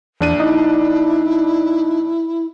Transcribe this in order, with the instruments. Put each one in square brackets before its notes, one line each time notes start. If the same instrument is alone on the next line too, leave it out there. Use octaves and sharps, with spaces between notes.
[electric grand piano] A#1 D4 D#7 [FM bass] E2
[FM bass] D#4 [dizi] E4